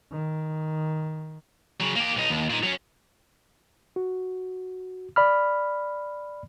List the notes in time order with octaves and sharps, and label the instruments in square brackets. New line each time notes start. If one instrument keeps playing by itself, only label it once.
[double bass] D#3
[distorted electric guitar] C#3 F#3
A#3 G4
B1 D#4
D#2
A#2 D#4
F#3 C#4
[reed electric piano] F#4
D5 B5 F6